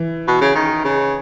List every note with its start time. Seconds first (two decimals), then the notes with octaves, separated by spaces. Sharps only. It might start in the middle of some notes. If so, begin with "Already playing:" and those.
Already playing: E3
0.28 B2
0.41 C#3
0.55 D#3
0.84 C#3